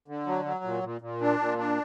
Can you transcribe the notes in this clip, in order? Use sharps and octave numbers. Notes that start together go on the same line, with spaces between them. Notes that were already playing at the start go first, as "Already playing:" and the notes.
D3
F#3
F#3
A#2
A#2
A#2
D4
A#2
D4